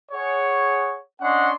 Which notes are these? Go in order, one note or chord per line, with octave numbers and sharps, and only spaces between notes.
G#4 C#5 F#5
C#4 D4 D#5 F#5 C6 C#6